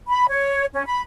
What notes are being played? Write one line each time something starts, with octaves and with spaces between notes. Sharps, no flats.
B5
C#5
C#4
B5